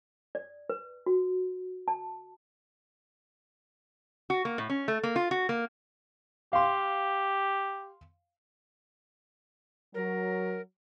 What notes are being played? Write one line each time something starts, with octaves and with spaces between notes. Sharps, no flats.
D5
B4
F#4
A5
F#4
A#3
A2
C#4
A3
A#3
F4
F#4
A#3
G4 F5 C6
F#3 A#4